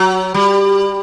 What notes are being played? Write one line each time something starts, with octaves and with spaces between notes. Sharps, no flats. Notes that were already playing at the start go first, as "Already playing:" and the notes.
Already playing: F#3
G3